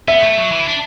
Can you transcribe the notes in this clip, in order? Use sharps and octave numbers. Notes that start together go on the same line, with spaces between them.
B3 E5
A3
F#3
E3
E4
D4